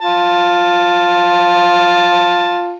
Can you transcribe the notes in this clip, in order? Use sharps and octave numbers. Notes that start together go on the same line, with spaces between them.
F4 A5